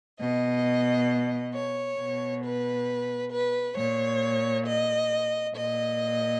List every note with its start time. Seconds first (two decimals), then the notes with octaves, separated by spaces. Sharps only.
0.19 B2 D#5
1.53 C#5
1.98 B2
2.43 B4
3.31 B4
3.76 A#2 C#5
4.66 D#5
5.55 A#2 D#5